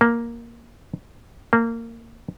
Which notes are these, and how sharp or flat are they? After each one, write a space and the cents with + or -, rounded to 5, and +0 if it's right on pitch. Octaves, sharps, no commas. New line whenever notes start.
A#3 +5
A#3 -20